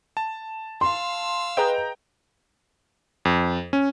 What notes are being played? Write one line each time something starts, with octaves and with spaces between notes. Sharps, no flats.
A5
F5 C6 E6
G#4 B4 D#5 G5 A#5 G6
F2
C#4